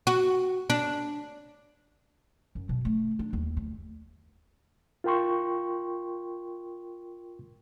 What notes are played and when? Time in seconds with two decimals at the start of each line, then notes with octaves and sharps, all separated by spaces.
0.07 F#4
0.70 D4
2.55 F#2
2.69 B2
2.85 A3
3.19 D4
3.33 D#2
3.57 D2
5.04 F4 A#4 G5 C6 C#6